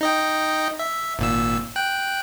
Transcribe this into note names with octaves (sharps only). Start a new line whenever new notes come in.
D#4 D#5 G5
E5
G#1 A#2 E6
G5 F#6